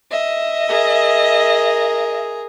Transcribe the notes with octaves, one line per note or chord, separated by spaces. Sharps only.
D#5 E5
G#4 A#4